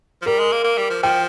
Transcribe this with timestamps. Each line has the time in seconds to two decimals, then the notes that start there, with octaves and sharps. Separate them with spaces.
0.22 F3
0.26 G3 A#4
0.39 G#3
0.52 A#3
0.64 A#3
0.78 G3
0.90 F3
1.03 F3 G5